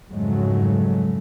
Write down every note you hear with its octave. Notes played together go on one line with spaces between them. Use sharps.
F2 G#2 C#3 F#3 G#3 A3